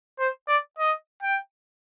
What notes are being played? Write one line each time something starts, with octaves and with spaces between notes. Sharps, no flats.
C5
D5
D#5
G5